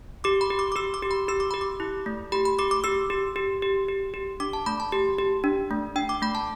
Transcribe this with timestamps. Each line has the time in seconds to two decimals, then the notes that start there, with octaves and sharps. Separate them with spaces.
0.24 G4 D6
0.41 B5
0.50 G4
0.59 D6
0.72 D6
0.76 G4 E6
0.94 D6
1.03 G4
1.11 B5
1.28 G4 E6
1.40 D6
1.51 G4 B5
1.61 D6
1.80 E4
2.06 A3
2.32 G4 B5
2.45 B5
2.59 G4 D6
2.71 D6
2.84 G4 E6
3.10 G4
3.36 G4
3.62 G4
3.88 G4
4.14 G4
4.40 D4 D6
4.53 A5
4.66 A3 B5
4.80 A5
4.92 G4
5.18 G4
5.44 D4
5.71 A3
5.96 D4 G5
6.09 D6
6.22 A3 B5
6.35 A5